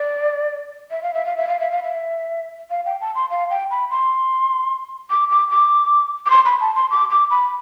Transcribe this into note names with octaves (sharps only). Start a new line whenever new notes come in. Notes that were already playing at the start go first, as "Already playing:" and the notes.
Already playing: D5
E5
F5
E5
F5
E5
F5
E5
F5
E5
F5
G5
A5
C6
F5
G5
B5
C6
D6
D6
D6
D6
C6
B5
A5
C6
D6
D6
B5